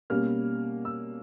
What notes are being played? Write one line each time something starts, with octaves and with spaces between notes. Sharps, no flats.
B2 G3 A#3 C#4 F6
E6